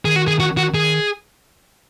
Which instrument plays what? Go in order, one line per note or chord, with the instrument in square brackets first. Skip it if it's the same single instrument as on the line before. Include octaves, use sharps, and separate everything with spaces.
[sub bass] D#3 [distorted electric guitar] G#4
[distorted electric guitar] F#4
G#4
F#4
F#4
G#4